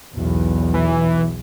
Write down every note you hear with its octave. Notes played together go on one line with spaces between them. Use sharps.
B1 E2
E3